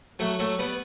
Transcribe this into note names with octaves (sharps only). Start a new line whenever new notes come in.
F#3 A3
F#3 A3
G3 B3